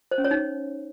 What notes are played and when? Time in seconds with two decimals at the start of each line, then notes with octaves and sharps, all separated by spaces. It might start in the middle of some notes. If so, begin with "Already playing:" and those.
0.11 C5
0.18 C#4
0.24 C#5
0.31 D#4